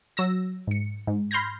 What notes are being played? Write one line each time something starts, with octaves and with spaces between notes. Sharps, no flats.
F#3 E6 A#6
G#2 C#7
G#2
B5 C6 F6 G6 G#6 A#6